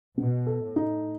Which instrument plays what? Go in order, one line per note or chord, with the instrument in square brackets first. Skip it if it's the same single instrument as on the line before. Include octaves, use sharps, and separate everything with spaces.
[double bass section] B2 [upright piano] B3
[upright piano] A4
[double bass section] A2
[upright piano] D#4